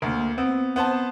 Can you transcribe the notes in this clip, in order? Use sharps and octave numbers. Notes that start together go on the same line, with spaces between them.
D2 A#3 A#4
B3 C4
B3 C5 A5